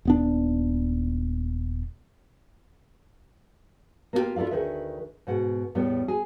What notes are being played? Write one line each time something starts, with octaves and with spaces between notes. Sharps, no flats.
D#1 B3 D4
A#3 B3 C#4 D#4 F4 G4
E4 F4 A4 D5 F5
D2 D#3 G#4 B4 E5
G#2 B2 F#5
E2 A2 G3 B3
G#4